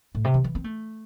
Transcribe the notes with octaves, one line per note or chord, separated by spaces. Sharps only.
A2
C3
E3
E3
C4
A3